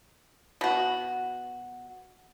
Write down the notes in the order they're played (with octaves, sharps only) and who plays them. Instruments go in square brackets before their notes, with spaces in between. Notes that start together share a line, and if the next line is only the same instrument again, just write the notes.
[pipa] B2 F#4